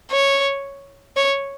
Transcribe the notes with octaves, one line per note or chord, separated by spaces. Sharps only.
C#5
C#5